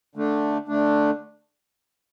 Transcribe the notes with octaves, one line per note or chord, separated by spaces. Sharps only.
D3 A3 D4
D3 A3 D4